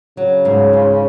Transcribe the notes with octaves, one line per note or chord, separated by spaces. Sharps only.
C#3 F#3
G#2
F4